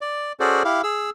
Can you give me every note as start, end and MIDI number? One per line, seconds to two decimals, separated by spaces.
0.01 0.32 74
0.40 0.63 61
0.40 0.63 66
0.40 0.63 68
0.40 0.63 69
0.40 0.63 72
0.40 0.63 74
0.65 0.82 64
0.65 0.82 67
0.65 0.82 77
0.83 1.10 68
0.83 1.10 88